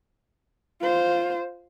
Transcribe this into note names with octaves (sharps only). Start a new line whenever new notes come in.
F4 C5